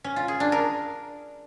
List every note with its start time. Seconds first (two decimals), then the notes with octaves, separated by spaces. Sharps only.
0.04 C#4
0.16 F4
0.28 G#4
0.40 D4
0.52 A#4